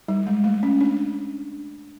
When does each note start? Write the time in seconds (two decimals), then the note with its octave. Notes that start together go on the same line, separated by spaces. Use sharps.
0.08 G3
0.27 G#3
0.44 A3
0.63 C#4
0.81 D4